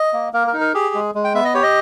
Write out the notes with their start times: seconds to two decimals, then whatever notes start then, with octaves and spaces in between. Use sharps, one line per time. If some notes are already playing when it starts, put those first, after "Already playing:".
Already playing: D#5
0.13 A#3
0.33 A#3 A#4
0.47 A#4
0.53 D#4
0.61 A#4
0.74 G4 G#4
0.95 G#3
1.15 G#3
1.24 G5
1.35 B3 E5
1.45 D#5
1.54 G4 C#5
1.63 D#5